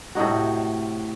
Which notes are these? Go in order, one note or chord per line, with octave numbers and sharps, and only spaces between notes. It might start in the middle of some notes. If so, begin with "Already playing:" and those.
A2 C3 D#4 F#4